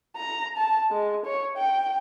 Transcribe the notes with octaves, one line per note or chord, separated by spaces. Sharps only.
A#5
A5
G#3
C#5
G5